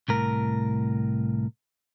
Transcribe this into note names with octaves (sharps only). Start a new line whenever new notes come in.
C2 A2 A#4